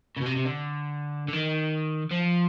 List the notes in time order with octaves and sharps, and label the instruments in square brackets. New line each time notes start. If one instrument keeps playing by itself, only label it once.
[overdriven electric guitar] C#3
B2
C3
C3
D3
D3
D#3
F3